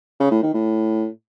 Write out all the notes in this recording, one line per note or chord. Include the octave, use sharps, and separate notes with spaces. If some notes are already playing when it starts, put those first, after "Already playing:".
C#3
A2
D#3
A2